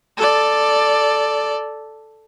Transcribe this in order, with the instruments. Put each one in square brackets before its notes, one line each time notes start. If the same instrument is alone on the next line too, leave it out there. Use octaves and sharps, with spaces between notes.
[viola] A4 D5